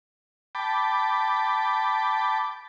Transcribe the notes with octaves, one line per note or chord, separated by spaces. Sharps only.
G5 A5 B5 D6